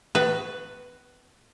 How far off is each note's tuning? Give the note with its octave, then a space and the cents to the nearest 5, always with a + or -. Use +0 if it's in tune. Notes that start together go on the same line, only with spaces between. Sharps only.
B3 +45 F#4 +0 B4 +0